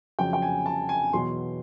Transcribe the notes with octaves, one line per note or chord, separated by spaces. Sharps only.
F2 C#3 F#3 G5
G5
G#5
A5
G#5
E2 B2 F#3 C6